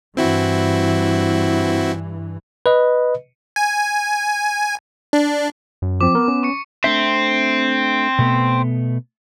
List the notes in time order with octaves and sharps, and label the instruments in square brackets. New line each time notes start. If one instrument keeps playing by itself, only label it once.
[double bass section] G2 E3 [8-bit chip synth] C4 E4 F#4
[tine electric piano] B4 D#5
[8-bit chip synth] G#5
D4
[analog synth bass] F#2
[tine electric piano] F3 C4 [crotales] D6
[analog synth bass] B3 [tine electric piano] A#4
[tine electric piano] C#4
[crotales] C#6 D6 C#7
[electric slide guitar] A3 D4 E5 [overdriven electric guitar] C4
[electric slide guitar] B2 A3 B3